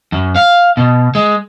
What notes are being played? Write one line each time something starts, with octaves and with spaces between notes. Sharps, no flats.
F#2
F5
B2
G#3